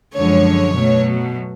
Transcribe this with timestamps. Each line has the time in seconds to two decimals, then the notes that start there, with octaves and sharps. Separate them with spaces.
0.15 F#2 D3 F3 G#3 C#5
0.76 B2 F#3 A3